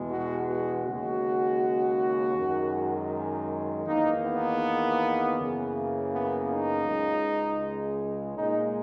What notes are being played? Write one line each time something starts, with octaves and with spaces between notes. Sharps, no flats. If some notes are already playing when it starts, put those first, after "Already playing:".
Already playing: E2 B2 G#3
F#4
F#4
D#2 C#3 G#3 F#4
F#2 D#3 G#3
E2 D#3 A#3 D#4
B3
F#2 C#3 E3 A#3
B3
D#4
C#2 C#3 G#3
A#2 G#3 D#4